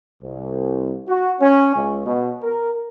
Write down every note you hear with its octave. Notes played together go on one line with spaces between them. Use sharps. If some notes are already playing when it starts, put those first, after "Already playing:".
C2
F#4
C#4
C#2
B2
A#4